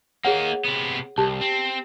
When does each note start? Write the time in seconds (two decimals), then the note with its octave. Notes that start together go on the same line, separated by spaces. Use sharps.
0.25 A#3 D#4 G#4 C#5 F#5
0.65 C3 B3
1.18 C2 G4 A5
1.41 C4